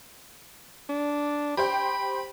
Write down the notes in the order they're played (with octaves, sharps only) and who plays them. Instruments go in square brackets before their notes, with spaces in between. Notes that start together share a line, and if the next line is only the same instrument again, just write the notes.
[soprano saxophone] D4
[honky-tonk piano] G4 C5 G5 [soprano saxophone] B5